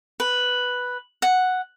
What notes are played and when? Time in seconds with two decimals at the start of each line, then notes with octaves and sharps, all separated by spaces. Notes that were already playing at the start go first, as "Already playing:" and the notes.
0.20 B4
1.22 F#5